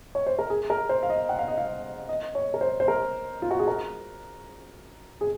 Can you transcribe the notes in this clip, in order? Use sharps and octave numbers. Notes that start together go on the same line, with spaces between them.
C#5
C5
A#4
G#4
A#4
C5
F5
D#5
F#5
F5
D#5
F5
D#5
C#5
A#4
C5
C5
A#4
F4
F#4
G#4
A#4
G#4